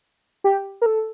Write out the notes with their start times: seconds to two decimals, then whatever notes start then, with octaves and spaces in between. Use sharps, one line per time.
0.44 G4
0.82 A#4
0.86 A4